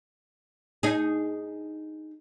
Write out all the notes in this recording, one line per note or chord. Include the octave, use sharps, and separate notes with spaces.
D#4 G#4